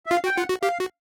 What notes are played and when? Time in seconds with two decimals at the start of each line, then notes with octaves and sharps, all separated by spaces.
0.06 E5
0.11 F4 F5
0.24 F#4 G5
0.36 F4 F#5
0.49 F#4
0.63 G4 F5
0.80 F#4